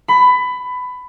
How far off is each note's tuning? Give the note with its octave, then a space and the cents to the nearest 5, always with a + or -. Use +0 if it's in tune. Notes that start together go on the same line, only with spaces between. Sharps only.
B5 +20